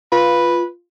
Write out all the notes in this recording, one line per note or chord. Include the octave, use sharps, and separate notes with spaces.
F4 B4